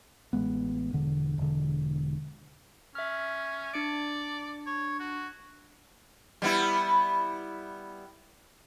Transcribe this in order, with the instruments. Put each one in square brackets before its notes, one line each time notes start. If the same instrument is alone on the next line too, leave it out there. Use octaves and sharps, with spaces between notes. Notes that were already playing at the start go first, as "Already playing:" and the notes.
[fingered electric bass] A1 G#3 B3
E1 D3
E1 D3
[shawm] C#4 [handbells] E5 F6
[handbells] D4 C#7 D7 [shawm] D5
[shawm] C#5
F#4
[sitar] G3 B3 E4